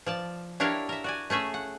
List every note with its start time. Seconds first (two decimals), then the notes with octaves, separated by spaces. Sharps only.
0.06 F3 D5 A5
0.60 D4 E4 G4 A#4 C#5 F5
0.89 A#4 E5
1.04 F#4 D5 G#5
1.30 A3 C#4 G#4 E5
1.54 F#5